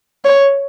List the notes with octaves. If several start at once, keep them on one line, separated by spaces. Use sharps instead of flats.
C#5